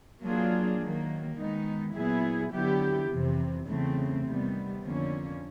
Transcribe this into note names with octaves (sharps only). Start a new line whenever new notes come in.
F#3 A#3 D4 F4 G#4
D#3 F#3 A#3
D#3 G#3 B3 D#4
A#2 F#3 B3 E4 G#4
D3 F#3 B3 E4 G4
F2 C3 E3
E2 C#3 E3 A3 C4
C3 D#3 G3 B3
F2 D3 F3 A#3 C#4